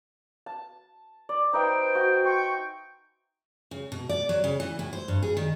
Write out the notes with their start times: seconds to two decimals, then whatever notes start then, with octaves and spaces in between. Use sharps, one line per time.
0.46 A5
1.29 D5
1.53 D#4 B4 C5 E5 G5
1.95 F#4 G#5
2.25 C5 G5 C#6
3.71 C#3
3.92 B2
4.09 D5
4.29 F#3
4.44 C#3
4.60 E3
4.79 A2
4.93 C5
5.08 G2
5.23 G#4
5.37 D#3